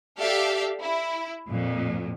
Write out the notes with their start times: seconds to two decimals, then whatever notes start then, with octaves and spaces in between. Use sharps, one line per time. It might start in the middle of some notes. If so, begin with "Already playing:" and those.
0.19 G4 A4 D5 E5 F5
0.81 E4
1.48 F2 A#2